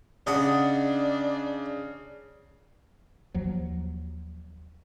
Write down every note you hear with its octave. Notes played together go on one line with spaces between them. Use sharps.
C#3 D4 D#5 F#5 A5
D#2 F3 F#3